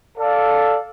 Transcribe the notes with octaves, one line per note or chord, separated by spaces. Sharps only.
A4 D5 F5